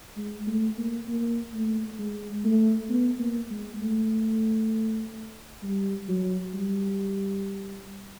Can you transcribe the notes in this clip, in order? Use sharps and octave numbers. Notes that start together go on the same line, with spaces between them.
G#3
A3
A#3
A#3
A3
G#3
A3
B3
A#3
G#3
A3
G3
F#3
G3